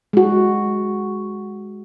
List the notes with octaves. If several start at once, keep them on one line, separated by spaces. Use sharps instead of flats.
G#3 F#4